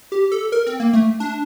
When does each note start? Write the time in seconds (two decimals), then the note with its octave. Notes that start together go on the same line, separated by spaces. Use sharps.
0.12 G4
0.32 A4
0.52 A#4
0.66 C4
0.80 A#3
0.93 A3
1.20 D4